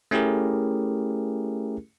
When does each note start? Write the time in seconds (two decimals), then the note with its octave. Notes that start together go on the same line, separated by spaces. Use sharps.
0.11 A3 C#4 E4 G4 G#4 A#4